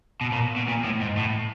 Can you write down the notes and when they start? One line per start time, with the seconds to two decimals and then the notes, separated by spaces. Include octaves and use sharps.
0.21 B2
0.32 A#2
0.57 B2
0.68 A#2
0.84 A2
1.01 G#2
1.17 A2